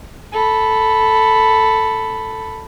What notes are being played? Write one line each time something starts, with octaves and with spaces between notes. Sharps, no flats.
A4 B5